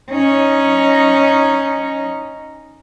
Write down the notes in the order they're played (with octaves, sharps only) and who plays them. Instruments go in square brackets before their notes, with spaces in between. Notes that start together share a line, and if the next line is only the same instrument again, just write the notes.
[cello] C#4 D#4